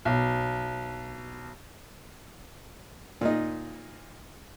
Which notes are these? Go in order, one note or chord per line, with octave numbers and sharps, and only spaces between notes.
B1
A#2 D#4